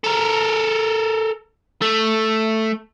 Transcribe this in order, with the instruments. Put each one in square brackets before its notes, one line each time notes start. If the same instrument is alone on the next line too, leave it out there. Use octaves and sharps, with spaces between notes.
[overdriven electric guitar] A4 A#4
A3